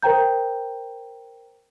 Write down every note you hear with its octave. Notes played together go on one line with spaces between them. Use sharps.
A#4 C5 G5 A#5 G6